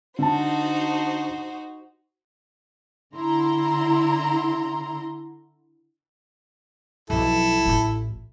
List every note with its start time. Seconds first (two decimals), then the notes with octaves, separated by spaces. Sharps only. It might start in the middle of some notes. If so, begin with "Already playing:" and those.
0.19 D3 D#4 F#4 C5 A5
3.14 D3 E4 A#5 C6
7.10 B1 F2 E4 A4
7.66 A1 F4